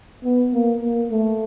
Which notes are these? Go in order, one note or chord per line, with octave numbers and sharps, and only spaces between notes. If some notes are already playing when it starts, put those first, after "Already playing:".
B3
A#3
A#3
A3